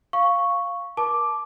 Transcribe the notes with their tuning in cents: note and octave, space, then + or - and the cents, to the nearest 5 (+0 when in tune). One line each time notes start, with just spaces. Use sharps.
F5 +0 C#6 +0
A#4 +35 A5 -20 D6 +0